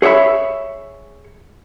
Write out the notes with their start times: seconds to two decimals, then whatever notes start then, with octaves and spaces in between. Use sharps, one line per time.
0.02 G#4 C#5 D5 E5 B5